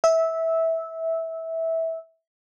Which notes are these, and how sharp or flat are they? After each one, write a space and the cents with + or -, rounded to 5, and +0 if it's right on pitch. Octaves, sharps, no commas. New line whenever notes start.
E5 -15